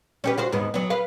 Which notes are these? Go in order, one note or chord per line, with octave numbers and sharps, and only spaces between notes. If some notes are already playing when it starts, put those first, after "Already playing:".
C#4 G4 B4
F4 F#4 C5
D#2 G#2 B3
F#3 B3
B4 F5